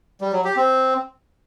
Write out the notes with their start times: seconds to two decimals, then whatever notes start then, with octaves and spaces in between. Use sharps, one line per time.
0.21 G3
0.33 F#3
0.44 G4
0.56 C4